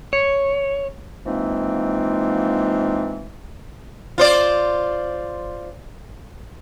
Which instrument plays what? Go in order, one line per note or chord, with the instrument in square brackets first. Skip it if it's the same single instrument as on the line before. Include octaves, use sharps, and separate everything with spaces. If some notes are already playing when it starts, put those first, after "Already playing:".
[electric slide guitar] C#5
[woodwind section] E3 F3 G#3 A#3 C4 D#4
[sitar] F4 C5 D5